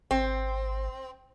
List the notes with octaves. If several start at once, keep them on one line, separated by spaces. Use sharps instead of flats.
G#1 C4